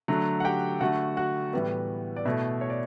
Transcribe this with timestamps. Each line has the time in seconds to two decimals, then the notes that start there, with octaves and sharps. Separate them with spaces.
0.08 D3 F#3 A3
0.40 F#5
0.44 G4 G5
0.81 D3 A3 F#4 F#5
1.17 F#4 F#5
1.53 A2 E3 G3 B3
2.16 D5
2.25 B2 A3 E4 E5
2.61 C#5
2.70 D5